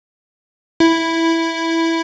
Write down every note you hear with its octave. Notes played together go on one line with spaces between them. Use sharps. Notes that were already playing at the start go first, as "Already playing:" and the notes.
E4